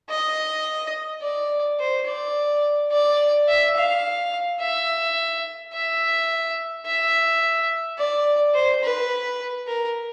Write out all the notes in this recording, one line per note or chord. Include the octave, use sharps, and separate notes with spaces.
D#5
D5
C5
D5
D5
E5
F5
E5
E5
E5
D5
C5
B4
A#4